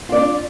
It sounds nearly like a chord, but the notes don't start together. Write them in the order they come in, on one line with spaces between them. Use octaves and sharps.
F4 D5 D4